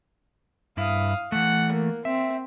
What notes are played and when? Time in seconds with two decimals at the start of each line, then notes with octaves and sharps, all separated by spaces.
0.77 G2 E4 F5 D#6
1.32 E3 A3 F#5
1.72 A#3
2.05 C4 E5